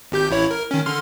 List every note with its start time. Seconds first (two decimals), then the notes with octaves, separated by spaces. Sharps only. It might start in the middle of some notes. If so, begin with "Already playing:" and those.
0.12 G#1 G4 G6
0.30 A1 E4 C#5
0.51 A#4
0.71 D#3 C#4
0.86 D3 C6 F6